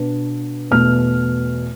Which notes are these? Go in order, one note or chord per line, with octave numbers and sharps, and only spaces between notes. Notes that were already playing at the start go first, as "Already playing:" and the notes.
Already playing: B2 B3 D4
E2 B2 A3 F6